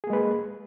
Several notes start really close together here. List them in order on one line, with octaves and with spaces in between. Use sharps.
G#4 A#3 G#3 B4